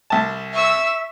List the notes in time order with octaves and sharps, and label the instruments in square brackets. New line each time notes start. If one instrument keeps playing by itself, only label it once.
[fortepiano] C2 A5
[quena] E5 [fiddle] C#6 E6